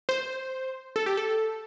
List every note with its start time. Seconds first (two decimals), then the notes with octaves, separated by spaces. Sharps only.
0.09 C5
0.96 A4
1.06 G4
1.17 A4